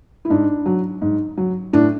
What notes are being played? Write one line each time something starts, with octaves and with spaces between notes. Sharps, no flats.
E4
G#2 D4
F#3
G#2
F#3
A2 D4